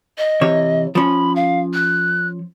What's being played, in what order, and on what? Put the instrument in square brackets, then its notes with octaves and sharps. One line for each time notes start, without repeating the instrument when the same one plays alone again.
[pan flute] D#5
[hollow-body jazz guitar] C3 E3 C#5
[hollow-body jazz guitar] F3 C#4 [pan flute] B5
[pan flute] F5
F#6